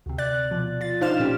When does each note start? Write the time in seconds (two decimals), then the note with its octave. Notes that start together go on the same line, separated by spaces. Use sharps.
0.06 D2 C3
0.18 D5 F#6 A6
0.51 B2 F3
0.81 F4 A6
1.01 D4 D#4 C5 F5 F6 E7
1.20 A#2 C#4 G4